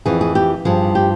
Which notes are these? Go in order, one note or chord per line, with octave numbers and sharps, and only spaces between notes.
F2 E3 G#4
G#4
G4
G2 F3 G#4
G4